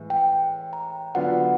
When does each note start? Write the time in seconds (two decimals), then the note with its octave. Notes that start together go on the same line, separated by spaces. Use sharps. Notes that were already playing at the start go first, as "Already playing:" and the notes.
Already playing: A2 E3 G#3
0.10 G5
0.73 A#5
1.15 D3 F#3 B3 D4 F4 F#5